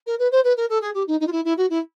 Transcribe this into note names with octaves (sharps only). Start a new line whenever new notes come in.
A#4
B4
C5
B4
A#4
A4
G#4
G4
D#4
D#4
F4
E4
E4
F#4
E4